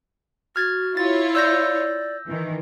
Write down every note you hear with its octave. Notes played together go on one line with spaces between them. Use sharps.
F#4 F6 G#6 A6
E4 F4 C#5 A6
D5 E6 G6 A#6
D#3 E3